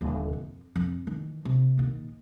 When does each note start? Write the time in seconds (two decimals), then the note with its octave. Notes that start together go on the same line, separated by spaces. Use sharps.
0.01 D#1 D3
0.33 F2
0.76 F2
1.07 D#3 E3
1.45 C3
1.78 A#1 D#3